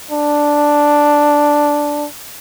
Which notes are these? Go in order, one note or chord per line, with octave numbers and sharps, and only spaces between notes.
D4